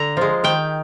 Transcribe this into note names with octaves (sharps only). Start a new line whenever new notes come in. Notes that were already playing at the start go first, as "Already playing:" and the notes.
Already playing: D3 A#5
F3 G#3
D#3 G5